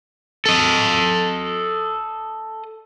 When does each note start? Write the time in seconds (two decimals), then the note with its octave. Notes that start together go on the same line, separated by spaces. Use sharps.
0.46 A4 D#5